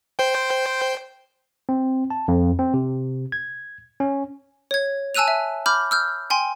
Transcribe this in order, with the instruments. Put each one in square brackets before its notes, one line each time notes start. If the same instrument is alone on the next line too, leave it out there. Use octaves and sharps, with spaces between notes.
[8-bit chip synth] C5 G5
[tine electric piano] C4
A5
F2
C4
C3
G#6
C#4
[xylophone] C#5 G#6
G#5 A5 E6 F#6 D#7 F7
E5
B5 D6 F6 G6
E6 F6 G6
G5 G#5 C6